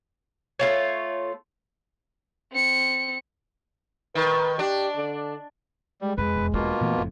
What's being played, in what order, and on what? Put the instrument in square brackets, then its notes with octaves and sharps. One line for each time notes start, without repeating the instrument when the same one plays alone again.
[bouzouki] A3 F4 C#5
[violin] C4 C#7
[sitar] D#3 [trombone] B4
[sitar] D4 [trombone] G4
[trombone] D3
[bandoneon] G3 [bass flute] G#3
[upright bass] F2 [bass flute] G#3 [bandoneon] B4
[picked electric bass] E1
[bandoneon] B2 A#3 F4 [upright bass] D4
[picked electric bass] A#2 E3 A3 [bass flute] B3
[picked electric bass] F#1 F2 A2